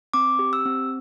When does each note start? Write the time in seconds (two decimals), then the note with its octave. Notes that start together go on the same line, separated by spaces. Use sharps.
0.13 C4 D6
0.39 G4
0.53 E6
0.66 C4